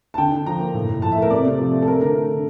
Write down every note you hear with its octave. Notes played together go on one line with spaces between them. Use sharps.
A5
D3 G5
D3
F3 A#5
A#3
A2
A2
F3 A5
E5
A3 A#4
C3 D5
C3
F3
A3
A4
A3 A#4
D3 A#4
A3
D3